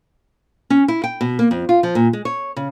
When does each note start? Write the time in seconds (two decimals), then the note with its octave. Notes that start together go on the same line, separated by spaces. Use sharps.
0.70 C#4
0.88 E4
1.04 G5
1.21 B2
1.39 A#3
1.51 F2
1.69 F4
1.83 F3
1.95 A#2
2.13 G#3
2.25 C#5
2.56 C#3